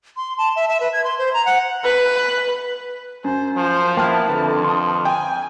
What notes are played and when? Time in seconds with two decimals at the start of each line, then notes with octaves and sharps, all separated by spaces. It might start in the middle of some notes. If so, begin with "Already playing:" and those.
0.17 C6
0.38 A5
0.56 E5
0.68 E5
0.80 B4
0.93 G#6
1.04 C6
1.18 C5
1.34 A#5
1.46 F#5
1.85 B4
3.24 F#2 C5
3.57 F3 C5
3.97 A#3 B3 E4 G5 A5 F6
4.29 F2 D3 B4
4.65 C6 D#6
5.05 G5 G#5